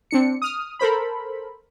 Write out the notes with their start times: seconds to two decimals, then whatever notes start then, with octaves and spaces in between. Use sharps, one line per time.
0.11 C4 D4 C#7
0.42 D#6 F6
0.79 A4 A#4 C5 B5